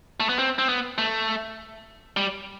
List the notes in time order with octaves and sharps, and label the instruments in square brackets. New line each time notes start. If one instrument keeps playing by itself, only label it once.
[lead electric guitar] A3
B3
C4
C4
B3
A3
G3